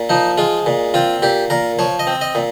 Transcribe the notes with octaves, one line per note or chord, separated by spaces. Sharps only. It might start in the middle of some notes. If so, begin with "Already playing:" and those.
Already playing: A#2
F3 D#4
G#3 F4
A#2
C4 F4
A#2 G4
A#2 A#4
F3 C#5
D#5
C4
D#5
A#2